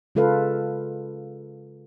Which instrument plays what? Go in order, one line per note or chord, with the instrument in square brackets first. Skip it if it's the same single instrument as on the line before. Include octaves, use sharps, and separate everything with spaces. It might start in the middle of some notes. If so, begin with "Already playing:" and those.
[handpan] C#3 G#3 F4 A4 B4 F5